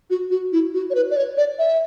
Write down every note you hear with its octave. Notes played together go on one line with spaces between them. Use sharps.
F#4
F#4
E4
F#4
C#5
B4
D5
C#5
D5
E5